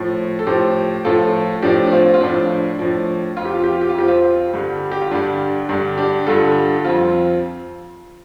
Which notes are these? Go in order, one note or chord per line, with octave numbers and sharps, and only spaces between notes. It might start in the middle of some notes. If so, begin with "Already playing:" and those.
Already playing: A2 F3
A4
A2 F3 G4 C5
A2 F3 F4 A4
A2 F3 D4 G4
D4
C4 F4
F4
A2 F3 D4
A2 F3
F2 F3 F4
G4
F4
G4
F4
G4
F4
F2 F3 G4
C4 F4
G2 D3 G3
G4
F4
G2 D3 G3 D4
G2 D3 G3 D4
D4 G4
G2 D3 G3 F4 A4
F2 F3 C4 F4